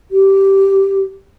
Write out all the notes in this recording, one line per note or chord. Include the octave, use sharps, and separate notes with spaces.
G4